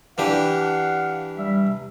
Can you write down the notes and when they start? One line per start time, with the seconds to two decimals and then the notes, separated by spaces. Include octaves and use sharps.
0.18 E3 D4 G4 F5 F#5
1.37 G3 E5
1.64 C3